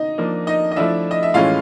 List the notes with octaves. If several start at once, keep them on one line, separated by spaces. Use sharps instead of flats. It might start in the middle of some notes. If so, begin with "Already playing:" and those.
Already playing: D#4 D#5
F3 A#3 D4
D#4 D#5
D#5
F3 A3 D4 E4 E5
D#5
E5
A2 E3 G#3 C#4 F4 F5